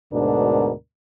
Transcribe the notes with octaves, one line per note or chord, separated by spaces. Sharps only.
D2 G#2 B2 D4 A#4